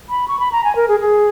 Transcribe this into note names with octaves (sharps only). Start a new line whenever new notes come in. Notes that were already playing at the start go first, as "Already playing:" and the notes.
B5
C#6
B5
A#5
G#5
A#4
G#4
G#4